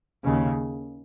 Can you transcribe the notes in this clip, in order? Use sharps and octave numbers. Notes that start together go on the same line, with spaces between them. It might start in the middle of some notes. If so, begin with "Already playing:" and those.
D#2 C#3